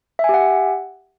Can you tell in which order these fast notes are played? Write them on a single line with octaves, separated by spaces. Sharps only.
E5 G#5 G4 F#5